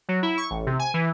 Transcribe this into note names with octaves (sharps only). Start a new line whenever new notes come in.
F#3
E4
C#6
A1
C3
G#5
E3